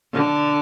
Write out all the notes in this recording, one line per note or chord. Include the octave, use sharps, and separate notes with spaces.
D3